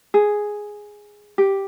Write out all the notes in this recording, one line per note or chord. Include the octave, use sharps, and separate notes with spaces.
G#4
G4